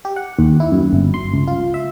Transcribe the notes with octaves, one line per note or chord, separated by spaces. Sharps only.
G4
F#5
D#2
E4
F#2
G1
C6
C#2
F4
E5